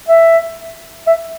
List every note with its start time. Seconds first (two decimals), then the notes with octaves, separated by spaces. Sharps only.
0.08 E5
1.07 E5